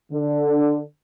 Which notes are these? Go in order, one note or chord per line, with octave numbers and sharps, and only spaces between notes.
D3